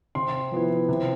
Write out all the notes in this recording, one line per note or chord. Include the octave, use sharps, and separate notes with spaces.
C3 C6
F3 B3 E4
C3